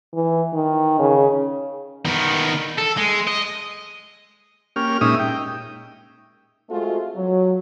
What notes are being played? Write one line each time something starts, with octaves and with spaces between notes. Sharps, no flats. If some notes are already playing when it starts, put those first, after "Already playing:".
E3
D#3
C#3
D#3 B3
A4
G#3
D#5
A#3 C#4 G4 F6
A#2 G#3 C#4 D#4 E5 D#6
G5
G#3 A3 C4 F4 F#4
F#3